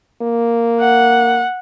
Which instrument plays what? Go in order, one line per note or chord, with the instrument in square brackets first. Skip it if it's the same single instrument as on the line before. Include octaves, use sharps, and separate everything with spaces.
[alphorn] A#3
[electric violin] F#5